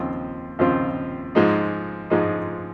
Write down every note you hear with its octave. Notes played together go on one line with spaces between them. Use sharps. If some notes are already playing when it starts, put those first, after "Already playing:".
Already playing: D#2 C#3 F3 C4 F4
D#2 C#3 F3 C4 F4
G#2 F3 G#3 D#4
G#2 F3 G#3 D#4